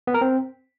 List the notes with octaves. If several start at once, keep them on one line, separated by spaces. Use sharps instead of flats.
B3
A#4
C4